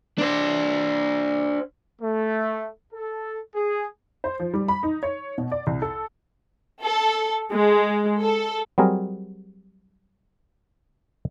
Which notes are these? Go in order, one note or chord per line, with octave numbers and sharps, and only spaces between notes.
D4 C5
A3
A4
G#4
C5
F3
G3
B5
D#4
C#5
B2
D5
C2
A4
A4
G#3
A4
F#3 G3 C4 G#4 A#4